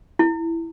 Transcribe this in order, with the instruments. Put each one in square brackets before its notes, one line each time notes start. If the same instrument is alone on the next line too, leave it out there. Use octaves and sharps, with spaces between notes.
[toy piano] E4